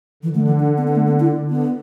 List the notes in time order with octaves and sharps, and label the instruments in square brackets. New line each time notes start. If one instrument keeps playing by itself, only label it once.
[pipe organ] D3 [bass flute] E3
[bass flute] A3
E3
D4
B3
B3
A3
B3
E4
[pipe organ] D3
[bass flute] B3